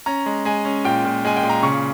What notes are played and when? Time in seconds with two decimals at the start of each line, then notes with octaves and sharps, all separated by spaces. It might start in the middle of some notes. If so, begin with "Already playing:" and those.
0.06 C#4 A#5
0.26 G#3
0.45 G#3 G#5
0.65 C#4
0.85 A#2 G5
1.05 A#2
1.25 G#3 G#5
1.37 G5
1.43 A#2
1.50 A#5
1.63 C#3 C#6